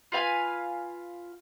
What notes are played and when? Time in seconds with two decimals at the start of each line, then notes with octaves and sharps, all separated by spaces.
0.12 F4 B4 F5 G#5